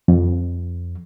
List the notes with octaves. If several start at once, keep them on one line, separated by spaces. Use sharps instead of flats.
F2